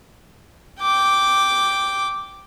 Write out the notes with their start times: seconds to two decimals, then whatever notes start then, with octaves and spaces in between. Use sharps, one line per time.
0.81 G5 D6